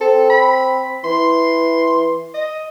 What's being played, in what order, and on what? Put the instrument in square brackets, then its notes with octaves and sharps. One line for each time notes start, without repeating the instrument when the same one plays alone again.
[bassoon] C4 [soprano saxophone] A4
[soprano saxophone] B5
[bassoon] E3 [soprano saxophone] C6
[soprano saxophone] D#5